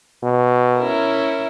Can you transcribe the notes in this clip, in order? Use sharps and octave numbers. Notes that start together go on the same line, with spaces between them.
B2
C#4 E4 A#4